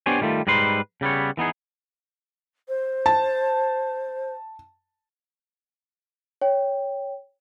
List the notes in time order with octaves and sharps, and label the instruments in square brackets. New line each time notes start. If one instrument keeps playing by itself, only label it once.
[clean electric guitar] B3 D4 G4 C5 C#5 G#5
D#3 G3 A3 F4
G#2 G3 D#4 B4 C6
C#3 G3 B3 C#5
E3 B3 D#4 G#4
[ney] C5
[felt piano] A5
[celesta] C#5 G5